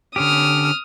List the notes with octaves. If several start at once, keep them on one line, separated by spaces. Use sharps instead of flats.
D3 C#4 G4 D#6 F6